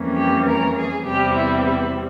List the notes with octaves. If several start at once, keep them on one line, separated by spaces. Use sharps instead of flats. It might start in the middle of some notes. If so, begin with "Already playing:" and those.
Already playing: F2 E3 G3 A#3 C#4
G4
A#4
G#4
E2 C3 G3 C4 G4
E4
E4